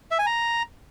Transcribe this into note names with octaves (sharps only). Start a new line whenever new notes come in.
E5
G#5
A#5